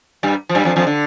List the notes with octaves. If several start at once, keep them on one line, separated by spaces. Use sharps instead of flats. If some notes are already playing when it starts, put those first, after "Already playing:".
G2 G3
F3
G2 G3
F2 F3
F2 F3
D3